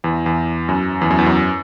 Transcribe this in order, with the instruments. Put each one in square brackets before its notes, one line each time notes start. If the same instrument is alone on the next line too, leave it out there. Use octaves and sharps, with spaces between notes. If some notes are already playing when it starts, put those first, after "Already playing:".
[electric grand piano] E2
E2
F#2
E2
F#2
E2
F#2